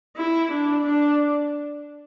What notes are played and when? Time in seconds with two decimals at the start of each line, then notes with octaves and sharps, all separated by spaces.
0.17 E4
0.51 D4
0.85 D4